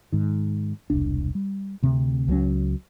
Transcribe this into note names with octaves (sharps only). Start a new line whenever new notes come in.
G#2 D#3
E1 C2 D4
G3
D2 C3 C4
C#2 F#3 A3 C#4